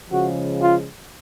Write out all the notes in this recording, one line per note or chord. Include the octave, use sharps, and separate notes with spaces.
C#3 F3 G#3 F#4
F4